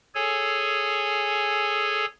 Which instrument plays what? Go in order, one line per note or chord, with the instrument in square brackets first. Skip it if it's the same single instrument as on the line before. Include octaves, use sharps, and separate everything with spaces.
[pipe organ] G#4 A4 C#5 G#5